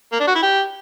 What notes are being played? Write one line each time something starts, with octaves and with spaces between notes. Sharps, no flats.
A#3
D4
F#4
E4
G4